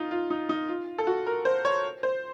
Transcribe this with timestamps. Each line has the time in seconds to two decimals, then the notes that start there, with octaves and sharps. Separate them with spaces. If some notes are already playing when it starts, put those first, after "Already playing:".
Already playing: D#4 F4
0.11 F4
0.30 D#4
0.49 D#4
0.68 F4
0.98 A4
1.07 F#4
1.26 A#4
1.45 C5
1.65 C#5
2.03 C5